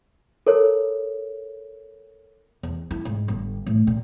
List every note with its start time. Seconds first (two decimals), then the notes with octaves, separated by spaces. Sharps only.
0.47 A4 A#4 C#5
2.63 E2
2.91 E4
3.05 G#2
3.28 G1
3.66 A2
3.87 A#2